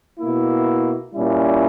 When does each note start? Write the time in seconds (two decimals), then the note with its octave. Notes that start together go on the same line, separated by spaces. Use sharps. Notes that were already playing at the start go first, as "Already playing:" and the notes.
0.20 B2 A#3 E4
1.14 A#2 G3 C#4 E4